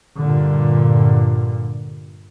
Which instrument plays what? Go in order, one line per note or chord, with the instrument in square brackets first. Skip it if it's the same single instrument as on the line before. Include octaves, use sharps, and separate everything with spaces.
[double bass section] G2 A#2 D3